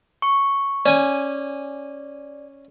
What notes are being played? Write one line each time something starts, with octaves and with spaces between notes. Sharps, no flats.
C#6
C#4 D5 G#5